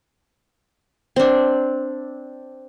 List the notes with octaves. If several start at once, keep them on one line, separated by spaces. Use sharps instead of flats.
C4 D4